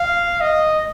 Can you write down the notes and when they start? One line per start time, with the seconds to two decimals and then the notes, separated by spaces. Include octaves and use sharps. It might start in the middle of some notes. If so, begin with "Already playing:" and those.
Already playing: F5
0.41 D#5